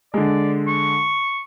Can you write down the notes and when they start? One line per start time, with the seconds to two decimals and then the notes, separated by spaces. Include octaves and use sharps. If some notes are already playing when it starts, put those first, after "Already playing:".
0.14 D3 G#3 D5
0.69 C#6